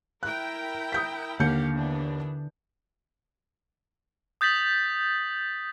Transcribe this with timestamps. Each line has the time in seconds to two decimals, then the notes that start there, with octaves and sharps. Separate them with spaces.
0.23 E4 A#4 G5 F#6
0.92 D#6 G6 B6
1.40 D#2 D3 G4 F5 F#5 G6 C#7
1.74 E3 B3 D4
4.41 D#6 G6 A6 B6 F#7